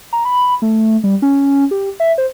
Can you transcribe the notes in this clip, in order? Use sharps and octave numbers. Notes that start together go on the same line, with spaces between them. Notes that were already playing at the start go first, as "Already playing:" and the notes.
A#5
B5
A3
G3
C#4
G4
E5
C5